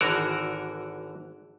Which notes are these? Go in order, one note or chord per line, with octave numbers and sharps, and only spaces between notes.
G#1 D3 E3 F#4 A#4